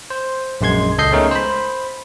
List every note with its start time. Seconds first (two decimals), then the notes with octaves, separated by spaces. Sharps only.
0.10 C5
0.61 A#1 F#2 G#3 C6 G#6
0.98 C#2 A4 D#5 G6 C7
1.12 G#3 A3 B3 C#4 D#4 A#4
1.31 C5 B5